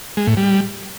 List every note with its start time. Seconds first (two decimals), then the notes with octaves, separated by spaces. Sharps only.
0.17 G#3
0.27 A2
0.37 G3